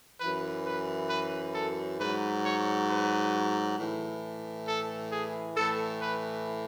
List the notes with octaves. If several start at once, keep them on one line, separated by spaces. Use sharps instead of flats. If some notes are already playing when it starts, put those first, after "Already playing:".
F#2 E3 B4
B4
B4
A4
G#2 F#3 B4
C#5
B4
A2 E3
A4
G#4
A2 E3 A4
B4